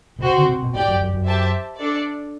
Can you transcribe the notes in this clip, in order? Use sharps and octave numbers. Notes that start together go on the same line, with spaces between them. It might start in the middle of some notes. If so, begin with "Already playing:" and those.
B2
C3 C4 F#4 C5
D3
C3
B2
A2 G4 D5 G5
F#2
F#2
F#2
G4 C5 E5 A5
D4 A4 D5